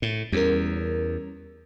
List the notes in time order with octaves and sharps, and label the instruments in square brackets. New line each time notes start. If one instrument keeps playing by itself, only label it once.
[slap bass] A2
[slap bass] E2 [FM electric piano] G3 C#4 A#4